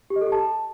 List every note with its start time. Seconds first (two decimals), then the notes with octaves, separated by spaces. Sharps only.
0.10 G4
0.16 D#5
0.21 A4
0.27 G4
0.32 A5